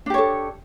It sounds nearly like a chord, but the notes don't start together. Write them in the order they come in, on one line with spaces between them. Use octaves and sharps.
D4 G4 C#5 A4